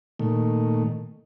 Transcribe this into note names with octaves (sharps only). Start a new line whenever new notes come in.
A#2 D#3 A3